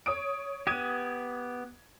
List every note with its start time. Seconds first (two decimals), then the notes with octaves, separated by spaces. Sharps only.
0.06 C#5 D#6 D7
0.67 B3 G4 D#6 G#6 D#7